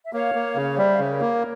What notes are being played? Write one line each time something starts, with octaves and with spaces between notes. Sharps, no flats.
E5
A#3 C#5 F5
A#3
C#3
F5
G3 C5 E5
F5
C#3 E5
A#4 C#5
A#3